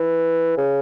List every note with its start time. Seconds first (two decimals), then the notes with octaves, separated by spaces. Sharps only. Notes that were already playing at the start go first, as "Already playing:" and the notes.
Already playing: E3
0.58 C#3